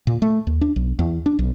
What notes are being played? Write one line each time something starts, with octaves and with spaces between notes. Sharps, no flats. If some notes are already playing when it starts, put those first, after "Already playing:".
A#2
A3
D#2
D4
B1
E2
D4
B1